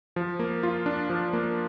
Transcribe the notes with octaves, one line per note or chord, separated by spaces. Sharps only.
F3
A#3
F4
D4
F3
A#3